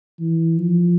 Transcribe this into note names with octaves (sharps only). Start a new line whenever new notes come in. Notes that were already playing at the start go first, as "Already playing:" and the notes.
E3
F3